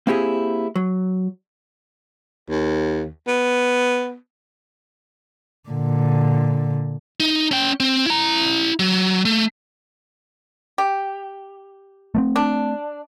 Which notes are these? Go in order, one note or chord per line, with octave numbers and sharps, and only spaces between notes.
A#3 C4 E4 G4 G#4
F#3
D#2
B3
A#2 D3
D#4
C#4 G5
C4
E4 A#5
F#3
A3
G4
A3 A#3 C4
D4